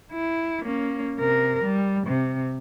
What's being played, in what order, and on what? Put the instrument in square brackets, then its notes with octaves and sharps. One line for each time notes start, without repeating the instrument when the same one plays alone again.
[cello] E4
A#3 C#4
C3 A#4
G3
C3